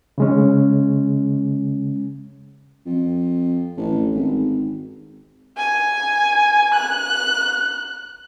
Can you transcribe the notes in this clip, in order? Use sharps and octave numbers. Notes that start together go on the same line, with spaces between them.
C#3 G#3 C#4
F2
A1
G#1
G#5
F#6